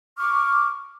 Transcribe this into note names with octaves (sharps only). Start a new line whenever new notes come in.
C#6 D6 F6